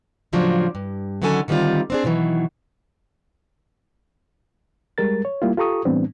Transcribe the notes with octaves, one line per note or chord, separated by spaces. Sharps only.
A2 C#3 F3 F#3 D4
G2
D3 D#3 F#3 C#4 A4 G#5
D3 D#3 G3 C4 F4
C4 D4 G#4
B2 D#3 E3 F#3
G3 G#3 A#4 A6
C#5
G3 A#3 E4 F4
F4 G4 A4 A#5 C#6 D#6
A2 E3 G3 B3 C4 D4